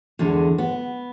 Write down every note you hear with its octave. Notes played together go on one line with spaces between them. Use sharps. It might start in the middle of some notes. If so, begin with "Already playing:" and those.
E2 D3 G#3
B3